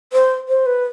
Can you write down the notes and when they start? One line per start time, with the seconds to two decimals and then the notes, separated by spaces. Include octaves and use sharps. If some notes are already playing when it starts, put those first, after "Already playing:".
0.13 C5
0.48 C5
0.66 B4